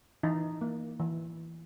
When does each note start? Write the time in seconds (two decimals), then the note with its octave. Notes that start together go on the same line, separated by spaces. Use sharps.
0.23 E3 D#4
0.61 A#3
1.00 E3